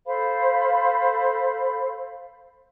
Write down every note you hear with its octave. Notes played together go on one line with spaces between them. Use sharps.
A4 C5 F5 B5